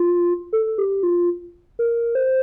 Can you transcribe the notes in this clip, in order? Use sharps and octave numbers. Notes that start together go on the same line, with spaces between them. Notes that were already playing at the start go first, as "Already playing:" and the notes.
Already playing: F4
A4
G4
F4
A#4
C5